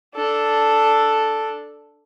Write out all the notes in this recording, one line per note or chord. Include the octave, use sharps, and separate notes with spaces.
D4 A4